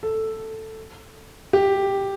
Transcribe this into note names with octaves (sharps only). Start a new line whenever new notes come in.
A4
G4